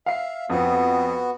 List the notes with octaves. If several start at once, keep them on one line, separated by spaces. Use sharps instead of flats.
E5 F5 C7
F2 B3 C4 F#4